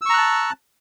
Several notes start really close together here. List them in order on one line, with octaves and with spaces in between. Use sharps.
E6 C#6 A#5 F#6 A5